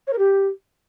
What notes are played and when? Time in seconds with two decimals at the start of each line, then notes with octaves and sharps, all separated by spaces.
0.07 C#5
0.13 A#4
0.18 G4